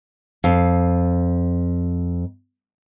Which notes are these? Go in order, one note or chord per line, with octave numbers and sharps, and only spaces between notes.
F2 F5